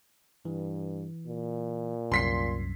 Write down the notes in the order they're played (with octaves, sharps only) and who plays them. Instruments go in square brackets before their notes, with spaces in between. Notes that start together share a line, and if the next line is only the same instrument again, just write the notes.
[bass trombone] G2 [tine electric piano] E3
[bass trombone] A#2
[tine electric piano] C2 F#2 [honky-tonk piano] C6 B6 C7